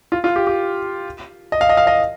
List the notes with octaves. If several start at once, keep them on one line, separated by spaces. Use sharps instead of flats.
F4
F4
G4
G4
D#5
F5
D#5
F5
D#5